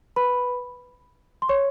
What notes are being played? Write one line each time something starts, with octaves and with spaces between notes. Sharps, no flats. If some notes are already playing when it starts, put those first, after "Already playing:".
B4 B5
C6
C#5 C#6